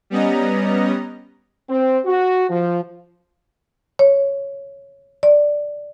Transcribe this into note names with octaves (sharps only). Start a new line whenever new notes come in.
G3 B3 C#4 D#5 A#5
C4
F#4
F3
C#5
D5